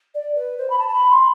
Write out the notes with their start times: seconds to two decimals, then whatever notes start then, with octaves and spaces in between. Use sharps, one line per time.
0.14 D5
0.35 B4
0.57 C5
0.70 B5
0.78 A5
0.89 A5
0.94 B5
1.11 C6